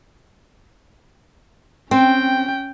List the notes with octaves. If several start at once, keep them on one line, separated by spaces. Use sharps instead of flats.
C4 C#4 G5